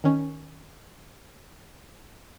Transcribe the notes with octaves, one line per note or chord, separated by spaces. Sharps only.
D#3 C#4